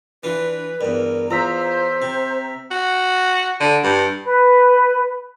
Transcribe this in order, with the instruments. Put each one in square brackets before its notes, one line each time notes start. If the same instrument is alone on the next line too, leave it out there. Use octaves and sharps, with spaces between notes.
[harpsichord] E3 F4 [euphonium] D4 [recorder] B4
[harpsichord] E2 G2 [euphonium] A#4
[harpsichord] E2 [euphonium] F4 [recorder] C5 [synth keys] A#5 E6 B6
[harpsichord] C3 [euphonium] C4
[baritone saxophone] F#4
D3
G2
[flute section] B4